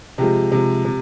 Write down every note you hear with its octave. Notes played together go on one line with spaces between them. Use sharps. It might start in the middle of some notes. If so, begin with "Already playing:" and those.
C3 F3 G#3 G4
C3 F3 G#3
C3